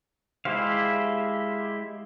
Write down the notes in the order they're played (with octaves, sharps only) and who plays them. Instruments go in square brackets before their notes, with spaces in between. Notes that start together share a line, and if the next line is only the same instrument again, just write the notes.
[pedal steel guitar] G#3 E4 G4 C5 F5